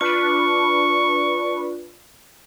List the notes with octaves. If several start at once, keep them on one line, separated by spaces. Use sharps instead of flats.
D4 F4 B4 C#6